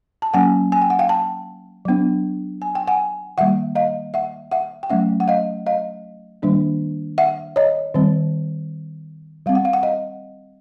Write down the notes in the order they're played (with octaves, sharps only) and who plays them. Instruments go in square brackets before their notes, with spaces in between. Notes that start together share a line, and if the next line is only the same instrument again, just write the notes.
[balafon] A5
F#3 A#3 C#4 F#5 G#5
G#5
G5
F#5
F5 G5
G5 A5
F#3 B3 D4
G#5
G5
F#5 G#5
D#3 G3 A#3 E5 F#5
D#5 F5
E5 F#5
E5 F#5
G5
F#3 A3 C#4 E5 F#5
F#5
D#5 F5
D#5 F5
D#3 G3 A#3 D4
E5 F#5
C#5 D#5
D#3 G3 C4
G3 C4 F5
F#5
F5
F#5
D#5 F5